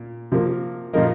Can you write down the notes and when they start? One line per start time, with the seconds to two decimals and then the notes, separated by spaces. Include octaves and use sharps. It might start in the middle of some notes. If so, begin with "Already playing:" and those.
Already playing: A#2
0.32 C3 F3 A#3
0.93 A#2 F3 A#3 A#4 D#5